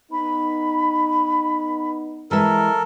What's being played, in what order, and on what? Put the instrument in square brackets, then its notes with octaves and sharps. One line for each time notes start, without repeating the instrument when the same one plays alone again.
[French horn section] B3 D#4 [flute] B5
[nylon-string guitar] E3 G#3 E5 [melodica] A4 A#4